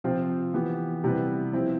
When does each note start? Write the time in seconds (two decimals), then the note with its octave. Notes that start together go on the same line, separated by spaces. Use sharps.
0.04 C3 F3 C4 F4
0.54 E3 B3 E4 G4
1.04 C3 G3 B3 E4 B4
1.53 F3 C4 E4